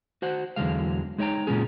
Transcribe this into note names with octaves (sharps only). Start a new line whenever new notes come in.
F#4 C5 F#5
E2 D3 E3 F#3 G#3 F5
G#3 D#4 C#5 D#5 G5 A#5
A#2 F3 G#3 C#4 F4 G#4